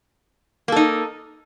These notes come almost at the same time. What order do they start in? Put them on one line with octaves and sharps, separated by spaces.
A#3 A4 D#4